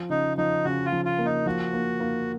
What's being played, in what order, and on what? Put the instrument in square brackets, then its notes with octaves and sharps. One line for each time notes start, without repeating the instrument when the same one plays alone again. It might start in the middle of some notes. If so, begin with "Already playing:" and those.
Already playing: [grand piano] F3
[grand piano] C#3 [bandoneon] D#4
[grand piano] F3 [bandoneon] D#4
[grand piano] C#3 [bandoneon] F#4
[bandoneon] F4
[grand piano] F3
[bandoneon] F4
[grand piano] A#3
[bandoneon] D#4
[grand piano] F3 [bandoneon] F#4
[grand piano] A#3
A#3